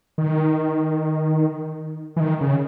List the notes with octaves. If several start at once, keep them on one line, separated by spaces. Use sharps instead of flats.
D#3
E3
D#3
C#3